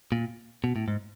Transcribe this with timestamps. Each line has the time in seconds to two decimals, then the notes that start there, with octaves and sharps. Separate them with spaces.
0.12 A#2
0.64 B2
0.76 A2
0.88 G#2